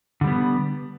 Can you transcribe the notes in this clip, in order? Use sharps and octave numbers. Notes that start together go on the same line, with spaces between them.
D3 G3 B3